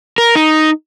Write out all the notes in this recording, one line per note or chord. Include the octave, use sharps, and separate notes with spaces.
A#4
D#4